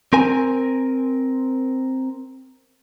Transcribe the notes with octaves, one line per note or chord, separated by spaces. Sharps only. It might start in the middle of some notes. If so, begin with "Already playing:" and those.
C4 A#4 G#5